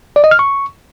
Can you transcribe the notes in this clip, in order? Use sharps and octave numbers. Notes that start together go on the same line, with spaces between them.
D5
D#5
F6
C#6